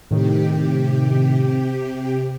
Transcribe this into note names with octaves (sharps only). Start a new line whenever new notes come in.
A2 C3 D#3 G4